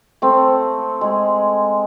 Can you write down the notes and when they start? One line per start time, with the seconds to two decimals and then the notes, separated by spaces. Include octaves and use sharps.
0.22 A3 C4
1.01 G#3 G#4